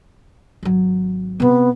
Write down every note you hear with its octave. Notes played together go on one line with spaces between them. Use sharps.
G#1 F#3
C3 B3 C4